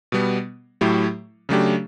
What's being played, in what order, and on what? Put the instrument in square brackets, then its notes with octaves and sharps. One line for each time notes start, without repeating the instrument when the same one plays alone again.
[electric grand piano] B2 G3 B3
A2 F#3 A3 E4 G4
C#3 F#3 A3 D4 G4